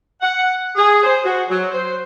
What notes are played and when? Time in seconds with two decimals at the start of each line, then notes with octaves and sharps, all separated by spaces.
0.21 F#5
0.76 G#4
1.03 C5
1.24 F#4
1.49 F#3
1.71 C5